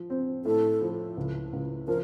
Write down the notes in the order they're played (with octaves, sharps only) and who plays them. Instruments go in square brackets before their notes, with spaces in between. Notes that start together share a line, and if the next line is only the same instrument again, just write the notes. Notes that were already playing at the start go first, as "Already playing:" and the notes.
Already playing: [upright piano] F3
C4
[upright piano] A2 [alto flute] A4
[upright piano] F3
C#2
C#2
[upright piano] F3 [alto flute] A#4